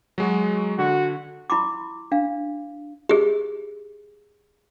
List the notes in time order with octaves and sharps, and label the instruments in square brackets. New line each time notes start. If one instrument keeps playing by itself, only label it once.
[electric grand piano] F#3 G#3 F#4
[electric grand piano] D3 [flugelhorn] F#4
[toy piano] E4 B5 C6 D6
D4 F5
G4 G#4